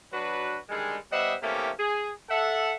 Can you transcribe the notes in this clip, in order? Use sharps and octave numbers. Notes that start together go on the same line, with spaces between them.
F#3 D4 F#4 B4
D3 D#3 G3 G#3
G3 B3 C5 D#5 E5 F#5
C3 E3 A3 A#3 C#4 G4
G#4
A4 E5 F#5